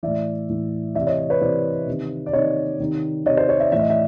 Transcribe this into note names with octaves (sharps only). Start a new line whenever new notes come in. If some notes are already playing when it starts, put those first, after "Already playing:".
A2 E3 D5 E5
A2 E3
C3 E3 D5 E5
C#5 D#5
B4 C#5
C3 E3 C5 D5
C3 D#3
D5
C3 D#3 C#5 D#5
C3 D#3
C3 D#3 C#5 D#5
C5 D5
C#5 D#5
D5 E5
A2 E3 E5
D#5
D5 E5